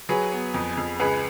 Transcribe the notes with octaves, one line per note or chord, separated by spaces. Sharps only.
F#3 G#4 B4
B3
F2
F2
C#2 G#4 B4